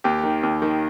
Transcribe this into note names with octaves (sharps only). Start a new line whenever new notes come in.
D#2 G4
D#3
D#2
D#3